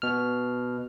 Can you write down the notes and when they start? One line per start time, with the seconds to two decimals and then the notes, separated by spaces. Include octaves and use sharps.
0.02 B2 F6